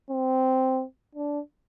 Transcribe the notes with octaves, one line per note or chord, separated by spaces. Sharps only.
C4
D4